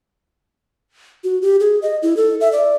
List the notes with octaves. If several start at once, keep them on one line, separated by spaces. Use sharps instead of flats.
F#4
G4
G#4
D#5
E4
A4
E5
D5